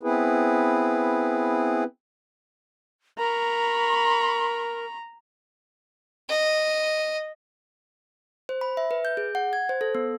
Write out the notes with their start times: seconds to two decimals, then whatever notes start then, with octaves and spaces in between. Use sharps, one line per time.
0.03 B3 C4 E4 G#4 B4
3.19 A#4 A#5 B5 C#6
6.29 D#5
8.49 C5
8.61 B5
8.77 E5
8.91 B4
9.05 G6
9.17 G#4
9.35 F#5
9.53 G#6
9.69 C5
9.81 A4
9.95 B3